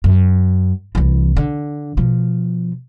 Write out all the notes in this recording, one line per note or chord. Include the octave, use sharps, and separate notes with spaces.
F#2
C2 E3
D3
B2 F3